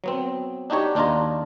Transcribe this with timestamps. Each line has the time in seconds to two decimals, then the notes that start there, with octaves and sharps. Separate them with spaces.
0.04 F#3 B3 C4
0.70 D4 D#4 F#4 G4 C#5
0.95 D#2 D4 D#4 F4 D#5 A#5